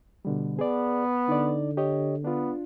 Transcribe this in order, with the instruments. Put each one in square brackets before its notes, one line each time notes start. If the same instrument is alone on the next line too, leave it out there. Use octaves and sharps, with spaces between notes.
[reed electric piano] B2 D3 G3
[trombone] B3 [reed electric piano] G#4 D5
[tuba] D3 [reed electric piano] D#4 D5
[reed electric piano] G4 C#5 D#5
[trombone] B3 [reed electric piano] D4 F4